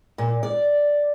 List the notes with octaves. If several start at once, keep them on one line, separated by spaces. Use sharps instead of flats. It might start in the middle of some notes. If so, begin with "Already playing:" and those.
A#2
D5